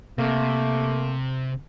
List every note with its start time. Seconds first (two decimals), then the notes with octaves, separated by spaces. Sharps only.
0.18 C3 A3 A#3